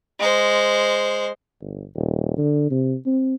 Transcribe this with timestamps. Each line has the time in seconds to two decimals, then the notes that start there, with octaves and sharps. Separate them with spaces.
0.19 G#3 C5
1.61 G1
1.95 D#1
2.38 D3
2.71 C3
3.06 C4